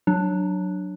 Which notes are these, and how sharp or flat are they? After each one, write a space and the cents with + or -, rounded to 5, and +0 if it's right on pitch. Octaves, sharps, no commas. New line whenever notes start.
F#3 +0 D4 +10